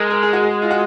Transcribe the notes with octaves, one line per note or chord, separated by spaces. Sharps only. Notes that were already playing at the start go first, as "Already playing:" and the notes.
Already playing: G#3 G#4 A#4
A#4
G#4
F#4
F4
F#4